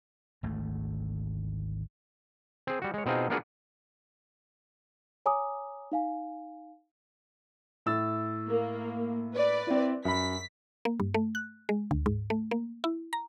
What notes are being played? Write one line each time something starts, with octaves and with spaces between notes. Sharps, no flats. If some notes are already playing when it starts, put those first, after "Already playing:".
G#1 D2 A3
C4 G#4
G3 F#4
G#3 C#5
B2 C4 D#4 F4 G#4
A#3 B3 D4 F4 F#4 G#4
C#5 G#5 A#5 D6 D#6
D#4 F5 G#5
A2 E6 A6
A#3
B4 D5
C4 E4
F#2 B5 B6
A#3
G2
A3
F#6
G#3
D2
G#2
A3
A#3
E4
A#5